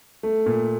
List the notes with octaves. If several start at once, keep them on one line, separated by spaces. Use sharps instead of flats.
A3
A#2